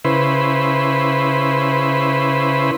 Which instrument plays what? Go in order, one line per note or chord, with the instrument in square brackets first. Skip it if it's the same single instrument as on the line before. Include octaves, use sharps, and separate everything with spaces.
[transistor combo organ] C#3 E4 B4 C5